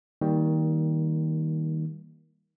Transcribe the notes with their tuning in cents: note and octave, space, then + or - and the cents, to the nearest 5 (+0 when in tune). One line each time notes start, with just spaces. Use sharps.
D#3 +20 G3 +0 A#3 +0